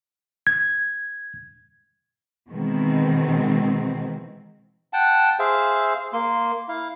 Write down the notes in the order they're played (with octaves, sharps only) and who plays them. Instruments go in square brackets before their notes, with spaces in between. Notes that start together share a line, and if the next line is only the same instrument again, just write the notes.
[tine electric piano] G#6
[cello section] B2 D#3 E3 G#3 C4
[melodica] F#5 G5 A5
G#4 C5 E5 F5
A#3 C6
E4 F5